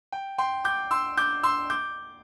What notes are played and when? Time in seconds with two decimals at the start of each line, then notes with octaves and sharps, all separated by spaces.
0.12 G5
0.38 G5 C6
0.64 D6 G6
0.91 C6 E6
1.17 D6 G6
1.43 C6 E6
1.70 D6 G6